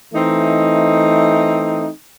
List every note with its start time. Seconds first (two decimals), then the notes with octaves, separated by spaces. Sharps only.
0.14 E3 A3 C4 D#4